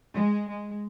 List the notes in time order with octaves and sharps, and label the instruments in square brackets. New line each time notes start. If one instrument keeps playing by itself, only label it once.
[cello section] G#3
G#3